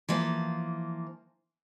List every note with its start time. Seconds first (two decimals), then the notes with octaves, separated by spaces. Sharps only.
0.09 E3 F3 A#3